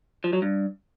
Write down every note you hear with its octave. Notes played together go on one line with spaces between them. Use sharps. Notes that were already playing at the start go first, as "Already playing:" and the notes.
F3
F#3
G2